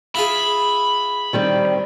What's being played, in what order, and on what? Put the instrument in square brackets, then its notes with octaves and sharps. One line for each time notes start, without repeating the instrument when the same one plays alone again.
[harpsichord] E4 F4 G#4 [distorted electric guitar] B5
[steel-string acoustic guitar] D#3 G3 C4